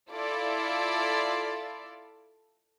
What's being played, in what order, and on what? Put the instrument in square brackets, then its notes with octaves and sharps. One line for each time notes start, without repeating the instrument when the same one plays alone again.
[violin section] E4 F4 A4 D5